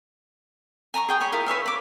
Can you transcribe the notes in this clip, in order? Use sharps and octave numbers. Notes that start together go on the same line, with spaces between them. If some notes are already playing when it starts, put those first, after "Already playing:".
G#5 A#5 B5 C#6
G#4 G5 D#6
C#5 G#5 B5
E4 F4 G#4 A#4
B4 C#5 E5 F5
B5 D6